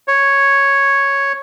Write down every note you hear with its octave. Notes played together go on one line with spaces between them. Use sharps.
C#5